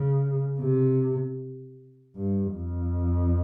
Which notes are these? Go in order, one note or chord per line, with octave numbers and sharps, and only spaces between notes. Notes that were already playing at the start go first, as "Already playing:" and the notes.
Already playing: C#3
C3
G2
F2